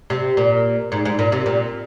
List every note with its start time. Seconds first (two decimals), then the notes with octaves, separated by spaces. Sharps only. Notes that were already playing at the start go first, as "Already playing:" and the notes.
0.10 C3
0.37 A#2
0.92 G#2
1.05 G#2
1.19 A#2
1.32 C3
1.46 A#2